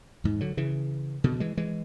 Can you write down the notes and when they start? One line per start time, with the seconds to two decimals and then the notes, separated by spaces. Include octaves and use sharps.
0.24 E2 G#2
0.41 D3 F#3
0.57 C#3 E3
1.24 B2 D3
1.40 E3 G#3
1.57 E3 G#3